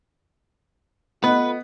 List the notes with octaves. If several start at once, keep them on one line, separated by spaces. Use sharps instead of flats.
B3 F4 A4 B4 D#5